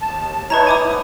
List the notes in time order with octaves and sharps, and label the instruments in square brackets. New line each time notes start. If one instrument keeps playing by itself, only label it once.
[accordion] D#2 A5
[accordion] D#4 E4 C#5 [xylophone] B4 A5 A#5
[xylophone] G#5 D6 D#6
[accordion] G#2 B3 E4